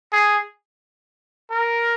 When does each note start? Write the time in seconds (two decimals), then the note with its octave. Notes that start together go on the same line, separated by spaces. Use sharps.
0.12 G#4
1.51 A#4